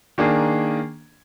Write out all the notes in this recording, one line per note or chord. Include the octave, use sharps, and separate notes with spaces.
D#3 A#3 D4 G#4